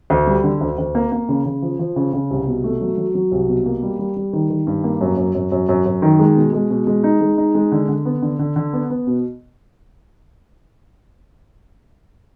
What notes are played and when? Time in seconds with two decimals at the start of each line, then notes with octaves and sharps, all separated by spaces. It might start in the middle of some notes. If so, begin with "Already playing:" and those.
0.10 D2
0.27 G3
0.44 D3
0.61 D2
0.78 D2
0.95 A#3
1.12 A#3
1.29 C#3
1.46 C#3
1.62 F3
1.79 F3
1.96 C#3
2.13 C#3
2.31 C2
2.47 B2
2.64 A3
2.81 F#3
2.98 F#3
3.15 F#3
3.32 C2
3.49 B2
3.66 A#3
3.82 G3
3.99 G3
4.16 G3
4.33 D#3
4.50 D#3
4.67 G2
4.84 A#3
5.01 F#2
5.17 F#2
5.35 F#2
5.52 F#2
5.69 F#2
5.85 F#2
6.02 D#3
6.19 G#3
6.36 B2
6.53 G#3
6.70 B2
6.87 G#3
7.04 D#4
7.21 G#3
7.38 D#4
7.55 G#3
7.72 D3
7.89 D3
8.05 B3
8.22 D3
8.39 D3
8.56 D3
8.73 B3
8.90 B3
9.07 B2